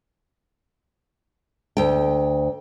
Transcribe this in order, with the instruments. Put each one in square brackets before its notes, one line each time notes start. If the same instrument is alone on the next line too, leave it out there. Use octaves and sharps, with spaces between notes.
[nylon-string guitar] D2 G5